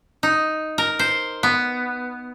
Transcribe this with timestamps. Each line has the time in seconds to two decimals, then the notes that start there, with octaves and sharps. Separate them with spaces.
0.23 D#4
0.78 A#4
0.99 C5
1.43 B3